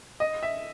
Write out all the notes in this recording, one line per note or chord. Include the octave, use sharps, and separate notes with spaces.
D#5
E5